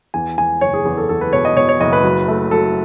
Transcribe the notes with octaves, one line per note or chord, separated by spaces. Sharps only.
E2 G#5
E2 G#5
F#1 C#5
G#4
E2 G#4
A4
E2 A4
B4
B2 C#5
D#5
B2 C#5
C#5
F#1 D#5
B4
F#3
A3
F#3 A4